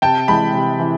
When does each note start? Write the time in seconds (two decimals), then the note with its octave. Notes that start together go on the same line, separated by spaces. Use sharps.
0.02 C3 G5 A5
0.28 E3 G#3 A5 B5
0.54 C3
0.80 E3